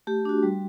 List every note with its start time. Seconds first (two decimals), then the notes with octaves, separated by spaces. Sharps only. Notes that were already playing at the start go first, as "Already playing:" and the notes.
0.07 A3 G4
0.25 D4 F#4
0.43 G3